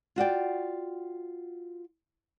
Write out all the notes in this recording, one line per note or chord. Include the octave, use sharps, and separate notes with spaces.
F4 F#4 D5 G5